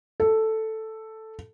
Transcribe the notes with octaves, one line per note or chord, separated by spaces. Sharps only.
A4